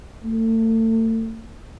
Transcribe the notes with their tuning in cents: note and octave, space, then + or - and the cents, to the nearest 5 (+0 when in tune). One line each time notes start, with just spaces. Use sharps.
A3 +35